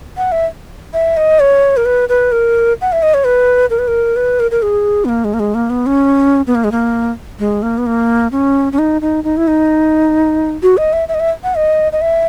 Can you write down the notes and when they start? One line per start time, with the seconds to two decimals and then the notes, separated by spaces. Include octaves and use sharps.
0.17 F#5
0.32 E5
0.93 E5
1.17 D#5
1.40 C#5
1.77 A#4
1.85 B4
2.09 B4
2.32 A#4
2.81 F#5
2.92 E5
3.03 D#5
3.14 C#5
3.24 B4
3.70 A#4
3.79 B4
3.88 A#4
4.16 B4
4.40 A#4
4.51 A#4
4.62 G#4
5.05 B3
5.09 A#3
5.24 G#3
5.34 A#3
5.40 G#3
5.55 A#3
5.70 B3
5.86 C#4
6.47 B3
6.55 A#3
6.64 G#3
6.72 A#3
7.39 G#3
7.63 A#3
7.78 B3
7.86 A#3
8.32 C#4
8.72 C#4
8.79 D#4
9.01 D#4
9.24 D#4
9.37 E4
9.47 D#4
10.63 F#4
10.77 D#5
10.93 E5
11.09 E5
11.14 D#5
11.20 E5
11.44 F#5
11.55 D#5
11.92 D#5
12.01 E5